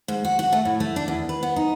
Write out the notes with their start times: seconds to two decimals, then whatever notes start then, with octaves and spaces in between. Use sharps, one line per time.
0.08 G#2
0.25 F#4
0.39 F#4
0.53 A3
0.65 A2
0.80 A3
0.96 D4
1.08 E2
1.29 B4
1.43 B3
1.56 D#4